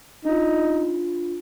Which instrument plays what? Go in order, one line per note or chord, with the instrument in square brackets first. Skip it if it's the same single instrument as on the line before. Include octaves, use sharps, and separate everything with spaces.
[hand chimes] D4 F4 [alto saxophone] D#4